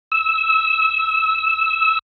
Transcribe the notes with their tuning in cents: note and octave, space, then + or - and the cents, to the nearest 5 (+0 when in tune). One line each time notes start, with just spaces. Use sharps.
E6 -20